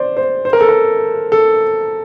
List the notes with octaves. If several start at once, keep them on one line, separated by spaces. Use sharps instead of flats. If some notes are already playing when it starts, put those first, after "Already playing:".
Already playing: C5 D5
C5
C5
A#4
A4
A#4
A4